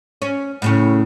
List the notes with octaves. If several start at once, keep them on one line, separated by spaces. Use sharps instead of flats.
C#4
A2 C#3 C#4